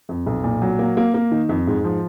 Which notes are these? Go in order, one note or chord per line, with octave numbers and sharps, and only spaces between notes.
F2
B1
A#2
F#3
A#3
A#3
A#3
D#3
F2
G#2
F3